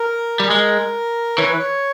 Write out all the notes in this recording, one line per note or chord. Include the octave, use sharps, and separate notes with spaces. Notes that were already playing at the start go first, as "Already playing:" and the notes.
Already playing: A#4
G3
G#4
G#3 A#4
E3 C#5
B4
C#5